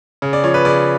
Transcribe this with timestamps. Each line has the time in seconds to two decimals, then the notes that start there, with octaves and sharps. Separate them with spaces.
0.22 C#3
0.33 D5
0.43 F3 C#5
0.54 B4
0.65 C#3 D5